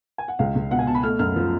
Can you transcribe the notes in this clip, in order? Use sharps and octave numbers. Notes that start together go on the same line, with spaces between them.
G#5
F#5
C#2 F5
C#2
B2 F#5
G#5
B2 A5
B5
A3 F6
F#2 F6
F3